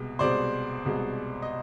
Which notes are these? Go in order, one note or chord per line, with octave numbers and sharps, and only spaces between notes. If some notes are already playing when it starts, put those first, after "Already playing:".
Already playing: C2 B2 G#3
C2 B2 G#3 C5 D5
C2 B2 G#3
D#5